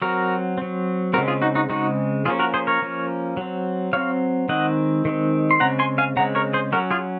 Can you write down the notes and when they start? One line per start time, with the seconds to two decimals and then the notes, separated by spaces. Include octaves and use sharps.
0.02 F#3 C4 F#4 A#4
0.58 F#3 C4
1.13 C#3 G#3 C4 F#4 A#4
1.28 F4 G#4
1.42 D#4 F#4
1.55 D#4 F#4
1.70 C#3 G#3 C4 D#4 F#4
2.25 F3 A#3 C#4 F4 G#4
2.39 F#4 A#4
2.54 G#4 C5
2.67 A#4 C#5
2.82 F3 A#3 C#4
3.37 F#3 C4
3.93 F#3 C4 C#5 F5
4.49 D#3 G#3 C4 D#5 F#5
5.05 D#3 G#3 C4
5.51 C6
5.60 C#3 G#3 C4 F#5 A#5
5.79 G#5 C6
5.98 F5 G#5
6.16 C#3 G#3 C4 F#5 A#5
6.35 A#4 C#5
6.53 G#4 C5
6.72 F#3 C#4 F#4 A#4
6.91 F4 G#4